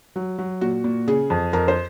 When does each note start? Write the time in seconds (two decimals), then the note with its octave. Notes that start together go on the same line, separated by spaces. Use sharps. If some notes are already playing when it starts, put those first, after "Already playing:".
0.16 F#3
0.38 F#3
0.61 A#2 F#4
0.84 A#2
1.07 C#3 G#4
1.30 F2
1.53 F2 A#4
1.68 C5